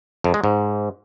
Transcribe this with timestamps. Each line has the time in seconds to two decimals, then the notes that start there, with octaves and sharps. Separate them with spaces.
0.24 F2
0.34 G#3
0.44 G#2